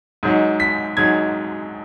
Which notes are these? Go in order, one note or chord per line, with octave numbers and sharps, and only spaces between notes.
G#2 F#3 D#4
B6
G#2 F#3 D#4 G#6